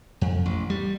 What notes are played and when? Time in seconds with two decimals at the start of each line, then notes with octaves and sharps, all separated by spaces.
0.21 F2
0.46 A1
0.70 G3